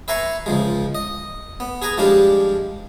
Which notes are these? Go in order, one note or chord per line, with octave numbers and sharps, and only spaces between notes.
B4 E5 G#5 A#5 C6 C#6
C#2 F3 G#3
D#5
B3
G#4 B4 G#5 A#5
F3 G3 G#3 D4 F4 G4